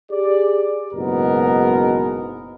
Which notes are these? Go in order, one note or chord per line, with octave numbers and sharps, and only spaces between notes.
G4 G#4 D5
F#1 G#2 B2 B3 A#4